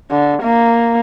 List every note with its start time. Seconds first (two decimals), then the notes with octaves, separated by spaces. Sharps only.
0.11 D3
0.43 A#3